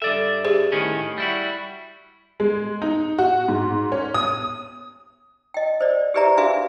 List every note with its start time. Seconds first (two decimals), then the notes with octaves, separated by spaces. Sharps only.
0.02 G2 A4 D5 E5
0.45 G4 G#4 C5
0.72 A2 D#3 C#4
1.18 G3 E4 F#4
2.40 G#3
2.82 D#4
3.18 F#4
3.48 G#2
3.92 C#4
4.14 D#6
5.54 D#5 G5
5.81 C5 D5
6.14 G4 G#4 B4 D5 E5 A#5
6.37 D4 F#4 G#4 B4 E5 F5